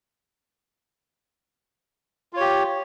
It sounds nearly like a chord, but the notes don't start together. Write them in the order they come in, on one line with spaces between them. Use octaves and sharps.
F4 C#5 G4